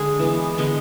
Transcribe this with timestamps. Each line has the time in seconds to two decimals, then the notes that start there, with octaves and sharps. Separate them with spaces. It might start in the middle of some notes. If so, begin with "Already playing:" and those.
Already playing: D3 G#3 G#4 G#5
0.19 E3 B3
0.58 D3 G#3 B3